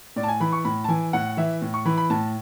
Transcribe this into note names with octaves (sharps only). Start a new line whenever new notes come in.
A2 D5
A5
G#5
E3 B5
C#6
A2 B5
A5
E3 G#5
A2 F#5
E3 E5
A2
C#6
E3 B5
B5
A2 A5